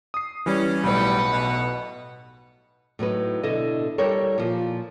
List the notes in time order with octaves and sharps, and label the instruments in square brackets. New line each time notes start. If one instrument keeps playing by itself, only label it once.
[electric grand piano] D#6 C7
[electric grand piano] E3 G3 [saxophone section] C#4
[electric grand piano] B1 A2 [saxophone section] G3 [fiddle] B4 F#5
[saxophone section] B2
[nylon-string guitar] A2 F#3 D#4 B4
B2 D3 E4 A4 D#5
G3 E4 G4 A4 A#4 C#5
A#2 F3